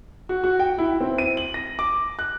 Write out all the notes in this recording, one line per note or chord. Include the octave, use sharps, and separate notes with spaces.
F#4
F#4
G5
E4
C4
D#7
F#7
A#6
D6
F#6